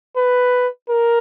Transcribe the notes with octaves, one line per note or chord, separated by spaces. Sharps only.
B4
A#4